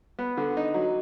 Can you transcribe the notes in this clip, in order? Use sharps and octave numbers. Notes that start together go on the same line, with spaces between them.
B3
D3
D#4
F#3